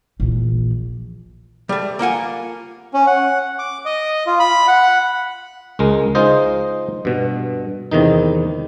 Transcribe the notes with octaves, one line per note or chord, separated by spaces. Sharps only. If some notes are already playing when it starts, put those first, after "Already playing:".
A#1 E3
G3 A3
A#3 F4 F#5 G#5
C#4
F#5
D6
D#5
F4
B5
F#5
C#2 G#3 A#4
G#3 D#4 F4 C5 D#5
G2 B2
E2 C3 D#3 D#4